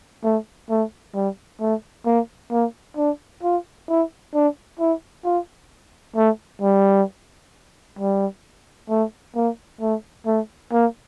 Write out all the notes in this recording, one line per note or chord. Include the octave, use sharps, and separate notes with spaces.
A3
A3
G3
A3
A#3
A#3
D4
F4
E4
D4
E4
F4
A3
G3
G3
A3
A#3
A3
A3
A#3